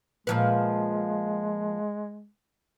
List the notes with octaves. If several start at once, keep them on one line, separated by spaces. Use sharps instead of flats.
A#2 F3 G#3 B4